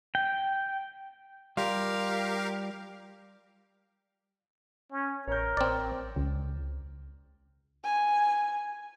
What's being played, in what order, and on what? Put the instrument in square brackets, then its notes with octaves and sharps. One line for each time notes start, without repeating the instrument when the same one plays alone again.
[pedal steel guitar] G5
[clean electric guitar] G3 F4 [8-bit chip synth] G4 A#4 F5
[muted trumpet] C#4
[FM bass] A1 [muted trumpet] A#4 [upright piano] C#5 G6
[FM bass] A1 [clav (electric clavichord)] C4 D5
[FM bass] C#2
[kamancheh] G#5